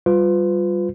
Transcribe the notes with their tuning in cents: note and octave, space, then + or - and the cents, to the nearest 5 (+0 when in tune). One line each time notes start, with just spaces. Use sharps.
G3 -10 F4 +15 B4 +35